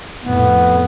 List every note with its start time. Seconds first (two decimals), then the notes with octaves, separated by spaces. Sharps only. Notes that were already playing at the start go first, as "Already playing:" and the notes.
0.24 F2 A2 B3